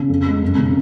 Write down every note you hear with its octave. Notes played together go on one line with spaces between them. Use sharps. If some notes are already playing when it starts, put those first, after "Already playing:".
Already playing: C#3
F2
G#3
F#2
C#3